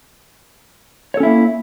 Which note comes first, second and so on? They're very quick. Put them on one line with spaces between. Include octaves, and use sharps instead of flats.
C#5 A4 C#4 E4 A#3